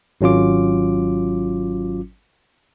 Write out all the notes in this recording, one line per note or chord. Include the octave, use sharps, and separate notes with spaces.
G#1 F#3 C#4 F4 D6